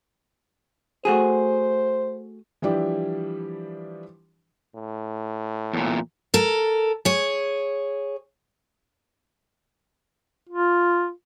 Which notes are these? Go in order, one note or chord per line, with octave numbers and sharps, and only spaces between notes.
A3 F#4 G#4 C5
E3 F3 G3 D4 E4 G4
A2
E2 A#2
A4 A#4
G#4 C#5
F4